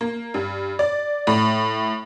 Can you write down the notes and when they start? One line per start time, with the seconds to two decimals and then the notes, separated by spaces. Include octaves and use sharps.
0.01 A#3
0.34 G2
0.79 D5
1.27 A2